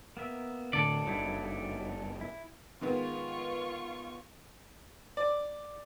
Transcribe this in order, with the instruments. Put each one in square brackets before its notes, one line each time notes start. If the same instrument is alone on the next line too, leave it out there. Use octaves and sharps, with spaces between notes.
[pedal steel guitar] A#3 B3 E5
[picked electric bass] A2 D3 [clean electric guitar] A4 D5
[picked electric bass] F#1 G2 [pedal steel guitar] F#3 D#4 E4
[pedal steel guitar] E4
[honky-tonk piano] D#3 G#3 B3 [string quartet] F4 C#6
[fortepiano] D5